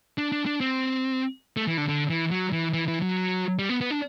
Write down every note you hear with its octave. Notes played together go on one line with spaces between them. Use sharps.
D4
D4
D4
C4
A3
E3
D3
D3
E3
F#3
E3
E3
E3
F#3
G3
B3
B3
D4